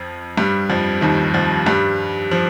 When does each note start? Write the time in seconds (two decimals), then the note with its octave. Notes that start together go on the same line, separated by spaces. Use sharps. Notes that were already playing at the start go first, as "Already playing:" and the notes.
Already playing: F2 F3
0.37 G2 G3
0.70 F2 F3
1.01 D#2 D#3
1.34 F2 F3
1.66 G2 G3
2.31 F3